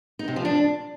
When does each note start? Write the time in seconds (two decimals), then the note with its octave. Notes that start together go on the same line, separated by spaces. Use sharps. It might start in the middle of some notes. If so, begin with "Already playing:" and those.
0.19 D#4
0.28 C3
0.36 F3
0.45 D4